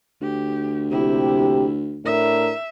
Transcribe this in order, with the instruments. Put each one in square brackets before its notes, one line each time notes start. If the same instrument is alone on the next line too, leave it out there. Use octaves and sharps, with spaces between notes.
[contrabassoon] D2 [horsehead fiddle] G4
[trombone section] A#1 C3 G4 [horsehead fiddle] E4
[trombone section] A2 D4 A#4 [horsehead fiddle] E5